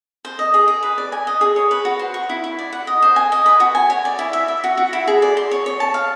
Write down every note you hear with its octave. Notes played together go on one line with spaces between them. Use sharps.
C5
D#5
G#4
G#4
B4
D5
G#5
D#5
G#4
C#5
B4
F#4
C5
C#6
E4
E4
D5
F#5
D#5
C5
G#5
D#5
B4
F#4
G#5
C#5
D5
E4
E5
E5
F#4
F#4
E4
G#4
D5
C6
C#5
C#5
A5
F5